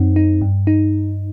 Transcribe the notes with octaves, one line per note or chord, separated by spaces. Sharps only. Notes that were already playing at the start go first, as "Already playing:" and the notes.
Already playing: F#2 C4 D#4
D#4
G2
D#4